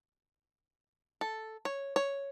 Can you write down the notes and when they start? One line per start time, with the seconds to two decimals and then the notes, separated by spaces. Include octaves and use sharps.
1.21 A4
1.65 C#5
1.96 C#5